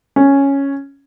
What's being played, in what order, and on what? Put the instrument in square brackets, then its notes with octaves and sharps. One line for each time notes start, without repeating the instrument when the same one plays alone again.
[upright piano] C#4